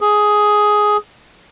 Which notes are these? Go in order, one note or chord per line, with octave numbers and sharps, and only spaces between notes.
G#4